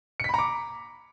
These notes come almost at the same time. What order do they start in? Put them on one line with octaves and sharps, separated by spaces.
C#7 B6 B5 A#5 D6